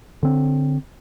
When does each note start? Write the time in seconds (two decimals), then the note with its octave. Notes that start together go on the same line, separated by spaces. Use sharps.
0.23 D3 C4